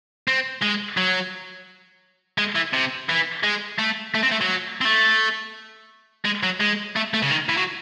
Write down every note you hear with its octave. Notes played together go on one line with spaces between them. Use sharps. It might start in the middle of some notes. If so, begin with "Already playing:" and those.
C4
G#3
F#3
G#3
E3
C3
E3
G#3
A3
A3
C4
A3
F#3
C4
A3
G#3
F#3
G#3
A3
A3
C#3
D#3
E3
F#3